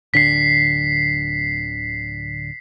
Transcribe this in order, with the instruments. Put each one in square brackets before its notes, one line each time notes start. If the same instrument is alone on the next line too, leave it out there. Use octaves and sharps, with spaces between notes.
[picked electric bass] D1 D3 [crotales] B6 C7